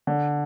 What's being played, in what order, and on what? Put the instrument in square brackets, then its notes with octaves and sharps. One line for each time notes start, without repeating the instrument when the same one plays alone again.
[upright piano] D3